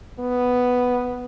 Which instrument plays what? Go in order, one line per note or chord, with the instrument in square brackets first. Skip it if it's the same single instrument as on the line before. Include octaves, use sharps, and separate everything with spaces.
[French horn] B3